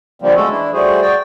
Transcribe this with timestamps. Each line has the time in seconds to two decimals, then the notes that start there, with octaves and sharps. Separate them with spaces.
0.22 D3 F3 G3 A#3 C4
0.36 G#3 A3 C#4 F#4 A4
0.49 E3 D4 E4
0.73 G3 A3 F#4 G#4 C5
1.02 F#4 D5 G5